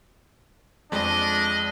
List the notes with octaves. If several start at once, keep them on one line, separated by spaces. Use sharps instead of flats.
F2 G#3 D4 D#5